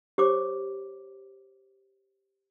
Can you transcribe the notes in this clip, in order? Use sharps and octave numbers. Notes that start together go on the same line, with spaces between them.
G4 C5 C#5 D6